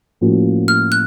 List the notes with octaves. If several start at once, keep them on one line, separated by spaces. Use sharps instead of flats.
A2 F3 A#3 C#4 F#4
F6
F#6